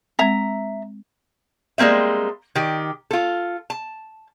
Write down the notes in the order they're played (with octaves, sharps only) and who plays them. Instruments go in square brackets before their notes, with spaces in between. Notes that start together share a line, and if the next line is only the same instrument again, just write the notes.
[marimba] G#3 C4 [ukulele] E5 A#5
[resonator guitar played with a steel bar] G3 G#3 A#3 C4 E5
D#3 G4
F4 A4
A5